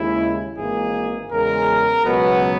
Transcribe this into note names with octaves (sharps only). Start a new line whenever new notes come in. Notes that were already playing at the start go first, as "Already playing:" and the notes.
Already playing: D#2 C#3 G#3 E4
G#1 G#2 E3 A#3 G#4
E2 C#3 G#3 A#4
C#2 B2 F#3 B3